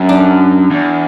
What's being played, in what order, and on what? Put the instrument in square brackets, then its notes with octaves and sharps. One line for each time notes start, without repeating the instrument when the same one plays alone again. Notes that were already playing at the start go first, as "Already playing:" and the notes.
Already playing: [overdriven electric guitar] F#2
[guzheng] D4
[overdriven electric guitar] E2